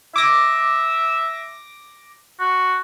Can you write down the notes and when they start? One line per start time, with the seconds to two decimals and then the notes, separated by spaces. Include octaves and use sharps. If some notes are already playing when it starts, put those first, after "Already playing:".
0.16 E5 D6 A#6
2.40 F#4